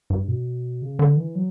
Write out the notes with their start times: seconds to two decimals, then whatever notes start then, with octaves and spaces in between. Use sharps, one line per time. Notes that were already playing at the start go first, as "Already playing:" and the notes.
0.10 G2
0.28 B2
0.82 C#3
0.99 D3
1.17 E3
1.35 F#3